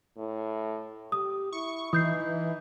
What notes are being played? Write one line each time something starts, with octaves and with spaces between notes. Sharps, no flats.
A2
G4 D#6
E4 C#6
E3 D#4 D#6 G6 C7